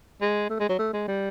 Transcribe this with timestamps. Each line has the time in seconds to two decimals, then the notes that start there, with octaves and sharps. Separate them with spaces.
0.21 G#3
0.50 A3
0.59 G#3
0.69 F#3
0.79 A3
0.93 G#3
1.08 G3